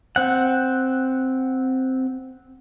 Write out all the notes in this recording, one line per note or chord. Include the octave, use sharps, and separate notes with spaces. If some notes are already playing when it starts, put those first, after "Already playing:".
C4 F#5